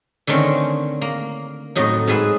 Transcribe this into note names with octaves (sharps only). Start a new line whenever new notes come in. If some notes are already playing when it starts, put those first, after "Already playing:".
D3 D#3 A3 C4 C#4
A#3
F2 A2 F#3 D#4
G#2 G#4 B4 E5 B5